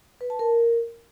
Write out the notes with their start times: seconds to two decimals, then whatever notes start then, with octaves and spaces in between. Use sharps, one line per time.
0.21 B4
0.30 A5
0.39 A#4